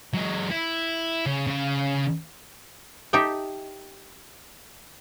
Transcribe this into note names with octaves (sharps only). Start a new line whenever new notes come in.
F#3 G#3
E4
C#3
C#3 F5
D#4 G4 A4 E5 G5